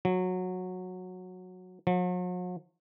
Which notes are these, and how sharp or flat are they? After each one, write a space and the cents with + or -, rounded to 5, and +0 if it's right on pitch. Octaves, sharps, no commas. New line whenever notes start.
F#3 -15
F#3 -45